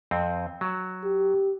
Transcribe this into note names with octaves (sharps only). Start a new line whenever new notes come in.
F2 C4
F#3
G4